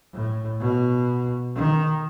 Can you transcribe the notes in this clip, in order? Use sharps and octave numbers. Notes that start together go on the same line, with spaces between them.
A2
B2
D#3